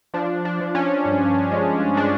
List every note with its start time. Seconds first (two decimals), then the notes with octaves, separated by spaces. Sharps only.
0.14 F3 D4
0.45 D4
0.60 F3
0.75 C#4
1.05 G2
1.52 G#3
1.97 G#3 D4